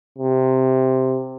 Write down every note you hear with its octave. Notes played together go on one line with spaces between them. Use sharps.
C3